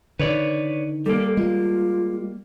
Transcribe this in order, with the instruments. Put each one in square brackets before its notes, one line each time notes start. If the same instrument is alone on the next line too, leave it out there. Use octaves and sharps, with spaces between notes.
[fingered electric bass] D3 D#3 [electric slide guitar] B4 C#5 D5
[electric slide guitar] G3 A#3 [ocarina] A4
[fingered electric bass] G#3 [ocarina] F4